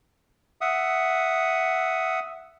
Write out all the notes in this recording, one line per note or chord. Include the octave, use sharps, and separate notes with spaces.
E5 F#5 D#6